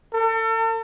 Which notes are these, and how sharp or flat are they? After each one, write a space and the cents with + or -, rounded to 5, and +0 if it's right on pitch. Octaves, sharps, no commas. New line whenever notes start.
A4 +40